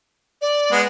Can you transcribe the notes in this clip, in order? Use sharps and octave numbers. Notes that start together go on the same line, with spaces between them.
D5
G#3 B3